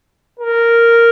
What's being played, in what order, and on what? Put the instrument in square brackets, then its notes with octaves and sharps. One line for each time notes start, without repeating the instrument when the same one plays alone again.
[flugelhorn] A#4